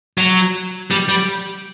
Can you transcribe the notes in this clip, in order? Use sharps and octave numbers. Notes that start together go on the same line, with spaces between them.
F#3
G3
G3